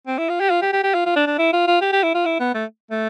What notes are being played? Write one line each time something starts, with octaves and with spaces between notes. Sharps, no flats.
C4
E4
F4
G4
F4
G4
G4
G4
F4
F4
D4
D4
E4
F4
F4
G4
G4
E4
F4
E4
B3
A3
A3